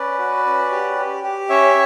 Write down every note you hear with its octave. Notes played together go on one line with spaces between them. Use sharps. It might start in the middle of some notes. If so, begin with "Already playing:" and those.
Already playing: C#4 B4 D5
F#4
C#4
G4
G4
G4
C#4 C#5 E5